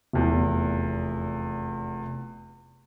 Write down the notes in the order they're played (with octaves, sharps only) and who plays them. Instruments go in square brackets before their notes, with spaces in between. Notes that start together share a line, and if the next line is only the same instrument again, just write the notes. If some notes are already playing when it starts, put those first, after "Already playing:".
[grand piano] F1 E2